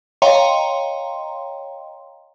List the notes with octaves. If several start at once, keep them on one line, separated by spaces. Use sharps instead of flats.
C#5 D#5 F5 G5 A#5 C6